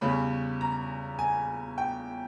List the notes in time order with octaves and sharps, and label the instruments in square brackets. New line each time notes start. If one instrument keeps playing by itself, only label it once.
[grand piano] E2 C#3 G3 C#4 B5
A#5
G#5
G5